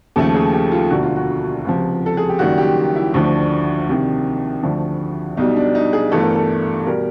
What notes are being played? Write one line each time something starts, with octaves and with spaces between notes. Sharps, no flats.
D#2 C#3 F3 A3 A4
G#4
G4
F4
E1 D2 D3 F#4
F4
F#4
C#2 C3 F3
A4
G#4
G4
F#1 F#2 D#3 G3 F#4
G4
E4
D2 D3 F3 D4
C2 C3 D#3
D2 D3 F3
B1 B2 G3 D#4
D4
D#4
G#4
G1 G2 E3 A3 A4
A#4
A4
B2 G3 A#4